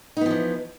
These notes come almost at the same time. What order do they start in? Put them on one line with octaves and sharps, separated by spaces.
D#4 B3 F3 E3